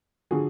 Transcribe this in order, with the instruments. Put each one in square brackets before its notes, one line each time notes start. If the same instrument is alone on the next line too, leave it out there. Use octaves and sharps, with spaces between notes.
[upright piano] D3 F3 F#4 G#4